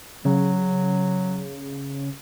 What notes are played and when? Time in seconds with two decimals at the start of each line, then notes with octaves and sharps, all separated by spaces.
0.25 C#3 F#3